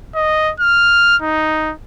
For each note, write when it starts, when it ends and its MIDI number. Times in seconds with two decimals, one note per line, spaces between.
0.15 0.52 75
0.60 1.17 89
1.22 1.73 63